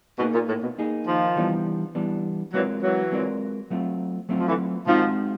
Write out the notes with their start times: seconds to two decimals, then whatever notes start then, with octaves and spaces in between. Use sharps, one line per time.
0.19 B2 A#3 D#4 G#4
0.34 A#2
0.48 A2
0.63 B2
0.78 A#3 D#4 G#4
1.07 D#3 F3
1.36 E3 G3 B3 D4
1.95 E3 G3 B3 D4
2.53 E3 F#3 G#3 C4 F4 A#4 D5
2.82 E3 F#3
3.12 G#3 C4 F4 A#4 D5
3.70 F#3 A3 C4 F4
4.29 F#3 A3 C4 F4
4.39 F3
4.48 D3 E3
4.87 D#3 F3 G#3 C4 D#4 F#4